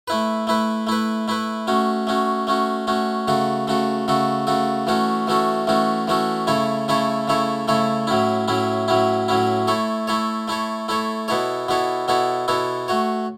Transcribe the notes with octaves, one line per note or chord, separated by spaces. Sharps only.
A3 E4 B4
A3 E4 B4
A3 E4 B4
A3 E4 B4
A3 C#4 F#4
A3 C#4 F#4
A3 C#4 F#4
A3 C#4 F#4
C#3 A3 F#4 A4
C#3 A3 F#4 A4
C#3 A3 F#4 A4
C#3 A3 F#4 A4
E3 A3 C#4 F#4 A4
E3 A3 C#4 F#4 A4
E3 A3 C#4 F#4 A4
E3 A3 C#4 F#4 A4
C#3 A3 E4 A4 C#5
C#3 A3 E4 A4 C#5
C#3 A3 E4 A4 C#5
C#3 A3 E4 A4 C#5
A2 F#3 C#4 E4
A2 F#3 C#4 E4
A2 F#3 C#4 E4
A2 F#3 C#4 E4
A3 E4 A4 C#5
A3 E4 A4 C#5
A3 E4 A4 C#5
A3 E4 A4 C#5
B2 B3 E4 A4 C#5
B2 B3 E4 A4 C#5
B2 B3 E4 A4 C#5
B2 B3 E4 A4 C#5
A3 F#4 C#5